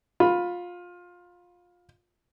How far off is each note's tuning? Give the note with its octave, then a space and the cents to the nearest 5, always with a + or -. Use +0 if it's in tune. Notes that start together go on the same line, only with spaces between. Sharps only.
F4 +20 B5 +0